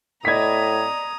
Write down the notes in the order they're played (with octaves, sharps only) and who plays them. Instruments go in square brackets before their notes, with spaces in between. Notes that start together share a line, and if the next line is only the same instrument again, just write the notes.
[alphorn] A2 [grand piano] D5 D#5 B5 [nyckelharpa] A#5 D#6 [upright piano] G#6 B6